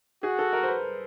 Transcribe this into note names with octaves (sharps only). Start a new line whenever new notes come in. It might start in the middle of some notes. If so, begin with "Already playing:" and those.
F#4 G#4
A4
A#4
C5
B4